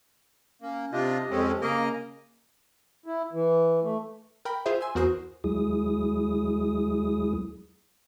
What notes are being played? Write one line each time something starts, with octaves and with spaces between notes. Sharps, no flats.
A#3 C#4
C3 D4 F4 G4 D#5
F2 G#3 C4 C#4 A4
C#3 A#3 C#4 D#5
E4
E3
A3
A#4 G5 B5
F4 G#4 C5 E5
G#5 C6 E6
E2 F#4 A#4 C5 D#6
D#2 F#3 G#3 E4 G#4 D#6